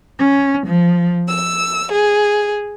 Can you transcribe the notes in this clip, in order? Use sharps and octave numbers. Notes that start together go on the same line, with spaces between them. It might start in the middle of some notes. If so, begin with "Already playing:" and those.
C#4
F3
E6
G#4